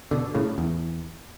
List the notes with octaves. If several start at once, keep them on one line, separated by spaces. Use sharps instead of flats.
B2 D3
A2 C#3
E2